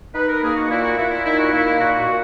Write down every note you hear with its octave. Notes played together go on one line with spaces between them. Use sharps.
D#4 B4
A#4
A#3 G#4
F#4
A#2 E4
F#4
A#2 E4
E4
D#4 E4
F#4
A#3 E4
E4
A#2 F#4
F#4
A#2